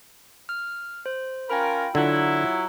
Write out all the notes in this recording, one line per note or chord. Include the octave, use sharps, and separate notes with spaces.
F6
C5
C#4 F4 A#4 G5 B5
D3 F#3 E4 F4